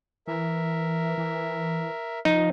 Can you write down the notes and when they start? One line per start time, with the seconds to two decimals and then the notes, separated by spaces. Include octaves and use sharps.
0.27 E3 A#4 E5
1.18 E3
2.25 F3 D#4